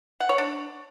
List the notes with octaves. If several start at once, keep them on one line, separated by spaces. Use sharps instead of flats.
F#5
C#5
D4